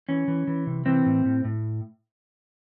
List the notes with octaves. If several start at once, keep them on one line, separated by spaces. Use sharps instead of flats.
E3 C#4
E3
E3
C3
E3 C4
A2
A2
A2